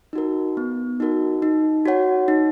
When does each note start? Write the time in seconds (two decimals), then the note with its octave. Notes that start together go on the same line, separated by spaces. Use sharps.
0.13 D#4 F#4 A#4
0.57 B3
1.00 D#4 F#4 A#4
1.42 D#4
1.86 F#4 C#5 F#5
2.28 D#4